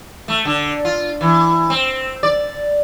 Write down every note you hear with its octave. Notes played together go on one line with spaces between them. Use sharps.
A3
D3
F4
E3
C4
D5